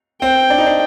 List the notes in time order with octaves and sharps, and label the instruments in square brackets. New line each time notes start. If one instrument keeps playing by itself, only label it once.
[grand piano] C4 [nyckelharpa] G5
[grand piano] D4
D#4
D4